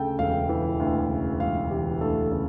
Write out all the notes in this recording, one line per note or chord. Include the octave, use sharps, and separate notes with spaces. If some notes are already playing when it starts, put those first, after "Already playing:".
Already playing: D2 C#3 A4 G5
E1 F5
E3
D2
C#3
E1 F5
E3 G4
D2 A4
C#3 A4